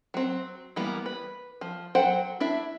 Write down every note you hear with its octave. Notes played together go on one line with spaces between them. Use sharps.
F#3 C4
E3 G3 A#3 B3
B4
F3
F#3 A4 C5 F#5 G5
D4 E4 E5